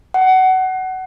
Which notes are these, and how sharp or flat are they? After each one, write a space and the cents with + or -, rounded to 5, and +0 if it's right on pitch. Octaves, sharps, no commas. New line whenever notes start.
F#5 +20